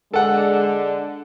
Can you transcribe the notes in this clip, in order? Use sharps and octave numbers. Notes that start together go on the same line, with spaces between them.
D3 G#3 D4 A4 F#5